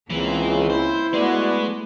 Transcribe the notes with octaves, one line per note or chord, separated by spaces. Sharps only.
C#2 E3 A#3 C4
E4 C5
G#3 A3 B3 F#4 B4 D5